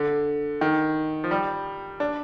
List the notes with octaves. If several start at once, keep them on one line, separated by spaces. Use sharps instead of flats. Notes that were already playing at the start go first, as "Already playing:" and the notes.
Already playing: D3
D#3
F3
G3
D4